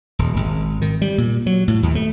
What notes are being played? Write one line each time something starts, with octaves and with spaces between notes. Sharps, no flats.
D#1
G#1
D#3
G3
A#2
F#3
A2
D#2
A3